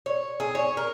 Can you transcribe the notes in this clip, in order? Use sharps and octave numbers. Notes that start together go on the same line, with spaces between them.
C#5
G#4
C#5
A#4